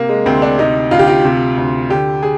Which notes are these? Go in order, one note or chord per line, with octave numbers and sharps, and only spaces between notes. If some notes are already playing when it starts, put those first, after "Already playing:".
Already playing: C3 A#3
G#3
D2 C4
D4
C3 D#4
D2 F4
G4
F4
C3
D2
D3 G4
G#4